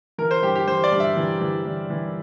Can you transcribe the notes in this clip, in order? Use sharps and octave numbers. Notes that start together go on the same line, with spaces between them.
E3 A#4
C5
G2 G4
G4
E3 C5
D5
G2
E5
E3
E3
E3
E3